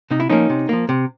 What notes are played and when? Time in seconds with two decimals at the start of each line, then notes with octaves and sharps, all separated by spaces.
0.11 C3 D#4
0.20 E4
0.30 F3 A#3 C#4 D#4
0.50 C3
0.69 F3 A#3
0.89 C3